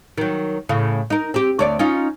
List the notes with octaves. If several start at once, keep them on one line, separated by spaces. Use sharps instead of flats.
D#3 F#3
A2 C#3
D#4 A#4
C4 G4
D2 C#5 D5
C#4 D#4 F4